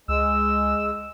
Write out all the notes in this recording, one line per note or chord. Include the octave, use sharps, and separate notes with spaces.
C#2 G#3 E6